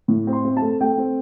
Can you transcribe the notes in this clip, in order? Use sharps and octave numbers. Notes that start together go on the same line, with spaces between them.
A2
C4
C6
C4
A5
A3
A3 G5
C4